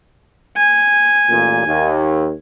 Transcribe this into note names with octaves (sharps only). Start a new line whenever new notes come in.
G#5
A1 A#2
D#2